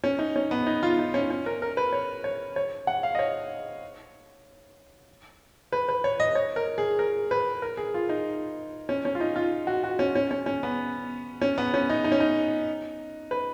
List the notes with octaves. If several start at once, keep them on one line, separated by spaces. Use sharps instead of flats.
C#4
D#4
C#4
B3
D#4
F4
D#4
C#4
C#4
A#4
A#4
B4
C#5
C#5
C#5
F#5
F5
D#5
C#5
B4
B4
C#5
D#5
C#5
A#4
G#4
A#4
B4
A#4
G#4
F4
D#4
C#4
C#4
F4
D#4
F4
F#4
F#4
C#4
C#4
C#4
C#4
B3
C#4
B3
C#4
D#4
D#4
C#4
D#4
B4